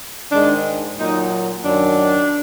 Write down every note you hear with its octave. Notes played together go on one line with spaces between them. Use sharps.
G#2 D#3 G#3 D4
A#2 F#3 D#4
F#2 D#3 F#3 D4